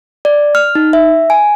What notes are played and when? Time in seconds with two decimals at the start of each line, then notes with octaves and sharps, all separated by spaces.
0.25 D5
0.55 F6
0.75 D#4
0.93 E5
1.30 G#5